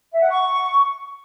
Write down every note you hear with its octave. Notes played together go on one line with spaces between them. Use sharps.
E5
F#5
C#6